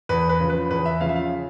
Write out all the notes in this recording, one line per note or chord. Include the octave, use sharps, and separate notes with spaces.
E2 B4
B4
C#3 F3
B4
E2 B4
E5
C#3 F3 F5
E5
F5